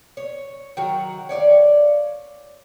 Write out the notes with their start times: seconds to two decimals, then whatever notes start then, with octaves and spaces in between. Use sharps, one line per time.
0.17 C#5
0.77 D#3 F#3 F#4 A#4
1.29 C#5 D5 E5 F5